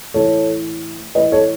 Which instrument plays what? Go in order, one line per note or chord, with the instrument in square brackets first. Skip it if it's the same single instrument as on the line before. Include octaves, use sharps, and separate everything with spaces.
[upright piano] A2 E3 A4 C#5
A2 E3 B4 D#5
A4 C#5